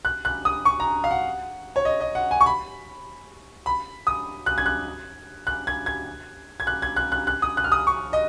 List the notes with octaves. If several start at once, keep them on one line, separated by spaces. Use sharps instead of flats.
F#6
F#6
D#6
C#6
A#5
F5
F#5
C#5
D#5
D#5
F#5
G#5
C#6
B5
B5
D#6
F#6
G#6
F#6
F#6
G#6
G#6
G#6
F#6
G#6
F#6
F#6
F#6
D#6
F#6
F6
D#6
C#6
D#5